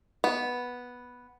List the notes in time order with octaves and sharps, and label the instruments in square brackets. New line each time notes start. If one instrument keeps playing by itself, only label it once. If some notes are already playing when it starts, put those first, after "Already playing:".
[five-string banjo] B3